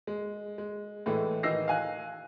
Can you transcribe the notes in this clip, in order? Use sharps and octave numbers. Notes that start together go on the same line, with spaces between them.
G#3
G#3
A2 E3 G#3 A3
D#3 E3 D#4 E6 A#6 C7
F5 G#5 F#6